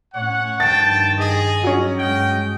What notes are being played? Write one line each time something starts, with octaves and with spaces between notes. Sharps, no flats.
A2 C#4 C#5 F#5
G2 D#3 F3 G5 A5 A6
G#4 D#5
F#3 C#4
G2 G#3 D#5 G5